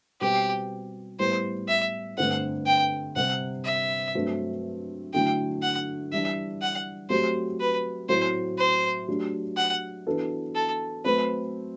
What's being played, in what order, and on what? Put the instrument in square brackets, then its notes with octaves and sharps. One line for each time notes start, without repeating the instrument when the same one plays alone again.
[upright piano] B2 G3 C4 [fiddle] G4
[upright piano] A2 G3 B3 [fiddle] C5
[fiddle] E5
[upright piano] G2 D3 A3 C4 [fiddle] F#5
[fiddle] G5
[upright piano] C3 G3 C4 [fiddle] F#5
[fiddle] E5
[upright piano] G2 F#3 A3 C4
[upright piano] D3 F#3 A3 E4 A4 [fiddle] G5
[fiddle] F#5
[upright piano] E3 G3 D4 [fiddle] E5
[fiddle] F#5
[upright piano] F#3 A3 C4 G4 [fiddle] C5
[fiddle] B4
[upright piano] A2 F#3 A3 C4 [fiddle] C5
[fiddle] C5
[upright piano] F#3 A3 D4 G4
[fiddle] F#5
[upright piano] E3 B3 D4 F#4 A4
[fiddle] A4
[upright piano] F#3 A3 C4 [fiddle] B4